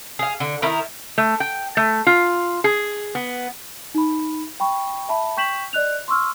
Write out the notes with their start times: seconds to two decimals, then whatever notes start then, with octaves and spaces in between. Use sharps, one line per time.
0.19 G#4 F5
0.40 D3
0.62 D#3 E4 A#4
1.18 A3
1.40 G5
1.77 A3
2.07 F4
2.64 G#4
3.15 B3
3.94 D#4 B5
4.60 G5 B5 C#6
5.09 E5 A5 B5
5.37 G5 C#6 G6 B6 E7 F#7
5.73 D5 D#5 F#6 F7
6.08 C6 C#6 E6 F6